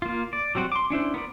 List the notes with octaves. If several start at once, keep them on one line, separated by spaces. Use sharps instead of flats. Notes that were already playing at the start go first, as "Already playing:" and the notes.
A#3 F4
D5
F#3 G3 C4 F#4
C6 D6
C#4 D4 E4 C5
B3 A#4 C5 D5